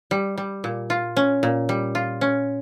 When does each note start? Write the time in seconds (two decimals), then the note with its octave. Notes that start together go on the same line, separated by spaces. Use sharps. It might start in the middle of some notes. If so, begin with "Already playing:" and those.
0.11 G3
0.38 G3
0.64 A#2
0.90 F4
1.16 C#4
1.43 A#2
1.69 G3
1.95 F4
2.21 C#4